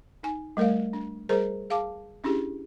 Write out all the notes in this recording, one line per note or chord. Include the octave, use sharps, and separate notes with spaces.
D#4 G#5
G3 A3 A#4 D5 F5
D4
G3 G#4 A#4 C5 A#5
G#4 F5 A5 D6
C#4 D4 E4 G4 G#4